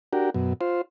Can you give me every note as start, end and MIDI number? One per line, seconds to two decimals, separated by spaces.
0.13 0.30 62
0.13 0.30 66
0.13 0.30 67
0.13 0.30 70
0.34 0.53 42
0.34 0.53 47
0.61 0.81 65
0.61 0.81 72